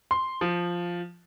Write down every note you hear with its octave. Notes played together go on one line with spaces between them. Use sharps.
C6
F3